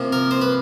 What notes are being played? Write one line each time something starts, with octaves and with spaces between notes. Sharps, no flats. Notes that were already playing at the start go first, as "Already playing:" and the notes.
Already playing: C3 F3 A#3
A#4
C5
B4